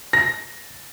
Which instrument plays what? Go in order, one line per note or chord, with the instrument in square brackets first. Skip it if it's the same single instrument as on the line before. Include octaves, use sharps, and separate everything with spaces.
[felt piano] A#6